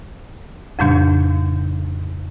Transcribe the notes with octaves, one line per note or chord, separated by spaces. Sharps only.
F2 A2 C#3 G3 D4